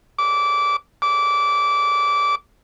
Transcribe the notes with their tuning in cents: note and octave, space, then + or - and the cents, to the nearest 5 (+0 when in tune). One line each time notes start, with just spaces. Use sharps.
D6 -20
D6 -20